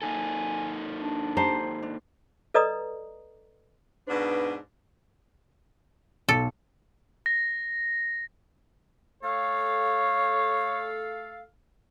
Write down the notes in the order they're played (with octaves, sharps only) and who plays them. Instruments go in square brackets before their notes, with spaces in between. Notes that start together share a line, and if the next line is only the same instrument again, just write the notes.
[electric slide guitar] A#3 D#4 A4 [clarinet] G#5
[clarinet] D4
[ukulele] G4 A5 A#5 [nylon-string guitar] C5
[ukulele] D4
[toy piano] A4 B4 D5 D#5 A#5 D#6
[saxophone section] G#2 B2 D4 [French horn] B4
[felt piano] B1 [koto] A4
[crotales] A#6
[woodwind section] A3 A4 F5 [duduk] C#5